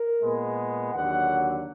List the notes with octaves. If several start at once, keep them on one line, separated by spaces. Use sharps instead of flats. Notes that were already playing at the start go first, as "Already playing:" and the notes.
Already playing: A#4
A#2 G#3 B3
D#2 D3 F#3 F#5